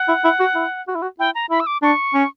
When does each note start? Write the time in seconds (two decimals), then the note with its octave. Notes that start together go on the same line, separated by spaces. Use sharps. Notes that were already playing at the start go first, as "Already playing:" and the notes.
Already playing: F#5
0.08 E4
0.24 E4
0.40 F#4
0.55 E4
0.88 F#4
0.95 E4
1.02 F#4
1.19 E4 G5
1.35 A#5
1.51 E4 B5
1.60 E6
1.67 D6
1.83 D4 C#6
2.14 C#4